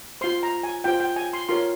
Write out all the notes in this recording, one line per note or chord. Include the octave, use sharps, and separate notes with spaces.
F4 C5 C6
A#5
G#5
F4 C5 G5
G5
G#5
C6
F4 A#4 C#5 C6